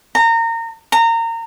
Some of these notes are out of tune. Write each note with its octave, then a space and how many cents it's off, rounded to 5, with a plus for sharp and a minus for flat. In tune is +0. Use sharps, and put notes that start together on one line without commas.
A#5 -25
A#5 -25